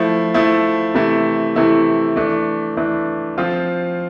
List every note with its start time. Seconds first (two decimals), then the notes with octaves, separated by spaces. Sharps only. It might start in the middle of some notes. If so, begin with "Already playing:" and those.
Already playing: F3 A3 E4
0.34 F3 A3 E4
0.94 C3 E3 A3 E4
1.56 C3 E3 A3 E4
2.16 E3 A3 D4
2.77 E3 A3 D4
3.38 F3 C4 F4